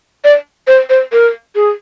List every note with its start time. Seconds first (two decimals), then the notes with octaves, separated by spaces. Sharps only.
0.24 D5
0.68 C5
0.90 C5
1.12 A#4
1.55 G#4